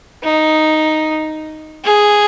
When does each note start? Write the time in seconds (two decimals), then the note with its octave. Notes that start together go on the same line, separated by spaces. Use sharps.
0.23 D#4
1.84 G#4